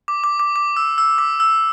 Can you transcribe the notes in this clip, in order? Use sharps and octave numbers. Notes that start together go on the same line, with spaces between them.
D6
D6
D6
D6
E6
E6
D6
E6